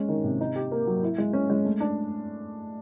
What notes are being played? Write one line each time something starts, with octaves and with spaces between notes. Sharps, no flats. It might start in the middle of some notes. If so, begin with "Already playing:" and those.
Already playing: G#3 C#4
D#3
C3
D#4
G4
A#3
F#3
E4
G#3
C#4
G#3
A3
D4